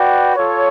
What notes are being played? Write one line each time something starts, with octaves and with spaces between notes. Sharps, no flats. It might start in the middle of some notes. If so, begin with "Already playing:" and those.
Already playing: F#4 B4 D5 G5
F4 A4 C#5